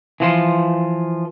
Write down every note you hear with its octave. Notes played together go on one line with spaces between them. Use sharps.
E3 F3 C6